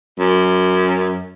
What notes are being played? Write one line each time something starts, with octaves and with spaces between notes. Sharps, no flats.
F#2